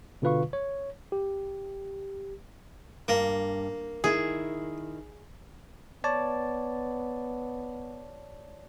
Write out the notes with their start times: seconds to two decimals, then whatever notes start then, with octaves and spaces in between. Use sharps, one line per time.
0.22 B2 D3 F4 B4 F5 C#6
0.53 C#5
1.12 G4
3.08 G2 A#3
4.04 D#3 E4 G#4
6.04 B3 C#5 D5 A5